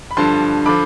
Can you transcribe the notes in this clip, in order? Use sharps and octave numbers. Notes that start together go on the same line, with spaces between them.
B5
G2 D3 F3 A5 C6
D3 F3 B5 D6